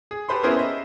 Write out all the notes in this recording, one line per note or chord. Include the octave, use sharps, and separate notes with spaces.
G#4
G4 A4 B4 C5 B5 C6
B3 C#4 E4 G#4 A#4 C5
C5 D#5 E5